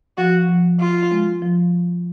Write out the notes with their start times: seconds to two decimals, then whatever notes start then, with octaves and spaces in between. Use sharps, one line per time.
0.18 F3 F#4
0.49 F3
0.80 F4
1.12 G#3
1.42 F3